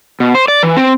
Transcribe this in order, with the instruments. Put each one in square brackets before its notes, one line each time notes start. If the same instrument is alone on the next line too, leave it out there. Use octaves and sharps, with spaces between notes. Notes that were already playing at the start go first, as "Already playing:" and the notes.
[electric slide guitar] B2
C5
D5
E3
C4